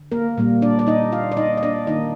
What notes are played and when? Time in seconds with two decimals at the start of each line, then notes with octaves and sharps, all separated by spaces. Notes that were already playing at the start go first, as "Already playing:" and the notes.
Already playing: D3
0.12 A#3 A#4
0.38 A#2 G3 A#3
0.62 D4 D5
0.79 D5
0.87 D#4 D#5
1.12 F4 F5
1.32 D5
1.37 D#4 D#5
1.57 D#5
1.63 D4 D5
1.87 D#3 A#3 D#4 D#5